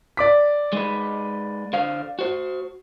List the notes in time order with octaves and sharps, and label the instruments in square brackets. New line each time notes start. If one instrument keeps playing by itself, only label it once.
[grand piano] D5 D6 B6
[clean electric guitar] G#3 D#4 B4
D3 C5 F5
F#4 C5